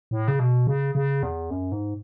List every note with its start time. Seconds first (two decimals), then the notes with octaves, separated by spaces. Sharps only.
0.11 A2
0.28 C#3
0.39 B2
0.67 C#3
0.95 C#3
1.23 E2
1.50 F#2
1.72 G#2